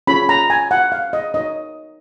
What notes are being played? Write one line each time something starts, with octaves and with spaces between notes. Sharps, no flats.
C#4 F4 G#4 C#5 B5
A#5
G#5
F#5
F5
D#5
D#4 F#4 A#4 C#5 D#5